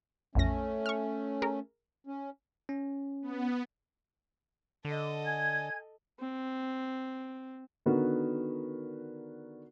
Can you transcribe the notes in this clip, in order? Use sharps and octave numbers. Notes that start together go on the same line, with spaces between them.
A#1 F2 A3 C#4 A#6
C#6 F6
G#4 A#4
C#4
C#4
B3
D3 A4 D#5
G#5 G#6
C4
D3 D#3 B3 F#4 A#4